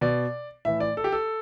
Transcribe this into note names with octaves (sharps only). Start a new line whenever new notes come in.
B2 D5
A2 E3 E5
D5
A4
G4
A4